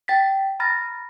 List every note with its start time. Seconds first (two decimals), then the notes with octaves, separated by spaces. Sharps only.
0.08 G5 A6 B6
0.60 A#5 B5 F6 A6 A#6